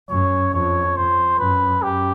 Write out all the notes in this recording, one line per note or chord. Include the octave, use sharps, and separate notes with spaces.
F#2 C#5
F2 C#5
F2 C5
F#2 B4
F#2 G4